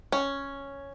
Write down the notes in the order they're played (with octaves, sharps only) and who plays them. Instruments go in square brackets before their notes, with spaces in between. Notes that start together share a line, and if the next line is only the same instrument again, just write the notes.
[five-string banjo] C#4